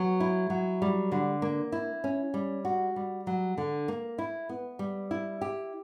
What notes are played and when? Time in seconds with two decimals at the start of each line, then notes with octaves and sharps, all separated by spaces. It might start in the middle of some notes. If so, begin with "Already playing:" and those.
Already playing: F#3 B3
0.20 E4
0.50 F#3
0.82 G3
1.12 D3
1.42 A#3
1.72 E4
2.04 C#4
2.34 G3
2.65 F#4
2.96 G3
3.27 F#3
3.58 D3
3.88 A#3
4.18 E4
4.49 B3
4.79 G3
5.11 E4
5.41 G4